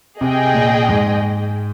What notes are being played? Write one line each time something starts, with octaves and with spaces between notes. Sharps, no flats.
C3 G#4 D#5 G5
A#2
G#2